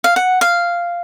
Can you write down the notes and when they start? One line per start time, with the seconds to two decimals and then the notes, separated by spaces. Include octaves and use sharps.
0.04 F5
0.16 F#5
0.41 F5